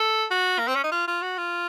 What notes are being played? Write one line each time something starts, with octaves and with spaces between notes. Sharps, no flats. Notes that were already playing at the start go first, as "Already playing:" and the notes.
Already playing: A4
F#4
A#3
C4
C#4
D#4
F4
F4
F#4
F4